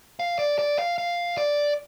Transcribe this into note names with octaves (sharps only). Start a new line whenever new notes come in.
F5
D5
D5
F5
F5
D5